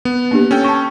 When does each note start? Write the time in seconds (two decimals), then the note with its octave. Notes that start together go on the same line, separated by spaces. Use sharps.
0.05 B3
0.31 A#3 D4 G4
0.51 C#4 A4 G5
0.64 A5 C#6